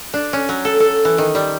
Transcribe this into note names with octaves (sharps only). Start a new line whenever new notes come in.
D4
C#4
F#3
A4
A4
E3
D#3
G3